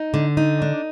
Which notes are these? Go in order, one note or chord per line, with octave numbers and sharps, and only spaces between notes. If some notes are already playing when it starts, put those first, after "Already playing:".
Already playing: D#4
D3
D#4
D4